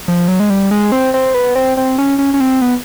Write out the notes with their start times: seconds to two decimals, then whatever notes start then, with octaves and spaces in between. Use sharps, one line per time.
0.08 F3
0.28 F#3
0.40 G#3
0.50 G3
0.71 G#3
0.92 C4
1.14 C4
1.34 B3
1.55 C4
1.77 C4
1.98 C#4
2.19 C#4
2.34 C#4
2.40 C4
2.61 B3